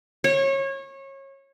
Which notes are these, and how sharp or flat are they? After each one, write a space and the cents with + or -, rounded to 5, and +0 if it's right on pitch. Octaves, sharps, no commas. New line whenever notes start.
C#5 -25